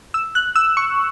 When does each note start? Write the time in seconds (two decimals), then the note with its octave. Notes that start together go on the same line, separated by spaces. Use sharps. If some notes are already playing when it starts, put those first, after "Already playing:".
0.14 E6
0.35 F#6
0.56 E6
0.77 C#6